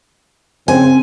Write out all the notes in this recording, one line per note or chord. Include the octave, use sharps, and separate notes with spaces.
C#3 C4 G#5